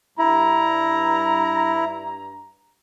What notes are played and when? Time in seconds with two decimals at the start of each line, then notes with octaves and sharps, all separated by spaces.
0.18 G2 E4 A#5